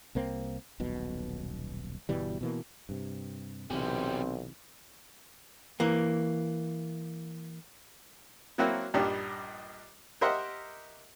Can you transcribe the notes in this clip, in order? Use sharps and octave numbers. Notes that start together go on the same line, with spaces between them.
C2 A#3 C4
D#1 B1 B2
G1 B2 E3 G3
B2 E3 A#3
G2 C3
B1 C3 E3 G3 C4 C#4
E3 A#3
F#3 A#3 C4 E4 F#4
A#1 G2 G3 D4 D#4 A#5
G4 A#4 C5 D#5 E5 F#5